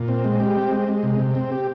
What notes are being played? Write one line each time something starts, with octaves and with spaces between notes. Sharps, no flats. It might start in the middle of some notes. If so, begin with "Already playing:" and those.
Already playing: A#2
C4
G#3
G4
C4
G#3
G#3
C3
C3
C4
G4